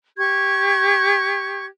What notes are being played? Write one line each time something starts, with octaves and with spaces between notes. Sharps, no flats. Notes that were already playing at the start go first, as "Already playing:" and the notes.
G4 C#6 G#6